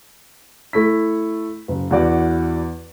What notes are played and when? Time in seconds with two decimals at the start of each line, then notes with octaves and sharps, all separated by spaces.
0.73 A3 E4 B6
1.68 F#1
1.91 E2 E4 F#4 D5